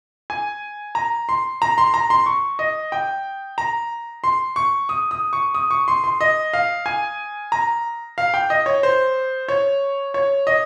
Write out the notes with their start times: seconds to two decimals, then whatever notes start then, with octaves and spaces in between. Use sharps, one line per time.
0.30 G#5
0.95 A#5
1.29 C6
1.62 A#5
1.78 C6
1.94 A#5
2.10 C6
2.26 C#6
2.59 D#5
2.92 G5
3.58 A#5
4.24 C6
4.56 C#6
4.89 D#6
5.11 D#6
5.33 C#6
5.55 D#6
5.70 C#6
5.88 C6
6.04 C6
6.21 D#5
6.53 F5
6.86 G#5
7.52 A#5
8.18 F5
8.34 G5
8.50 D#5
8.66 C#5
8.83 C5
9.48 C#5
10.14 C#5
10.47 D#5